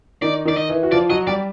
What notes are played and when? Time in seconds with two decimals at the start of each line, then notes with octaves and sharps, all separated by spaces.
0.22 D#3 D#4 D5
0.45 D#3 D#4 D5
0.57 D#5
0.69 E3 E4
0.83 F#4
0.92 F3 F4 D5
1.10 F#3 F#4 D#5
1.27 G3 G4 D5